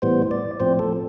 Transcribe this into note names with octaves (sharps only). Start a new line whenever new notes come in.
A2 E3 G3 B3 C5
D5
A2 F3 C4 C5
A4